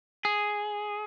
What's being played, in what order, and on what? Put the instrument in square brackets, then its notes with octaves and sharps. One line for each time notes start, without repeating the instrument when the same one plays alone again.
[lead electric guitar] G#4